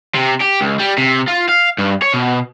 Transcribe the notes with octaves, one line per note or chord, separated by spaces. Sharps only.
C3
G4
C#2
G3
C3
F4
F5
G2
C#5
B2